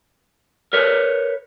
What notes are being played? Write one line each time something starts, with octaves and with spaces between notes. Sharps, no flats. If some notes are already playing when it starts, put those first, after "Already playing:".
A#4 B4 C#5